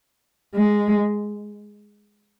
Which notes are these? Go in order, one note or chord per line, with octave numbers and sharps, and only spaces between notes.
G#3